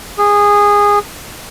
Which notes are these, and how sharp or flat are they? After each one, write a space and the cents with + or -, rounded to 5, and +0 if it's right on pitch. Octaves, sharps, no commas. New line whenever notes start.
G#4 -20